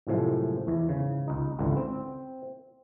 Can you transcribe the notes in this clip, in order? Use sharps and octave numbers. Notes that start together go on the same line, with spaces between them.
F#2 A2 C3 F3 G#3
E2 E3
G#2 C#3
C#2 D#4
G#1 C#2 D3 E3
C4